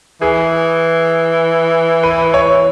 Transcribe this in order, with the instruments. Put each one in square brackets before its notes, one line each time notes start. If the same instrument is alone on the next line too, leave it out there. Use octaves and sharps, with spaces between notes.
[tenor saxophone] E3 [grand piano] G#4
[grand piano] B4
C#5